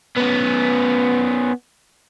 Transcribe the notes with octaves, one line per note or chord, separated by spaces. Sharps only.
B3 C#4